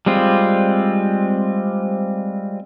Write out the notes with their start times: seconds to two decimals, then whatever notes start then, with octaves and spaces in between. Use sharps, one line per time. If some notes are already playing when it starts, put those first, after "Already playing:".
0.06 G3 G#3 C4 F4